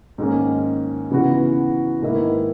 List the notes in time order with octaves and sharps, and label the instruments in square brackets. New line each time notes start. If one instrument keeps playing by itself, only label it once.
[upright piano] G#2 D#3 A#3 C#4
C#3 E3 B3 F#4
G#2 D#3 A#3 E4 B4